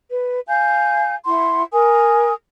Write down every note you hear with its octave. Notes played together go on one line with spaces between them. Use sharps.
B4
F5 G#5 G6
E4 F#5 C6
A#4 G#5 D#6